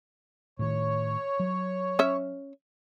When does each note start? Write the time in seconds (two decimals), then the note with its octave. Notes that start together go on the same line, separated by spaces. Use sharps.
0.59 A2 D#3 C#5
1.40 F#3
1.99 C#4 E5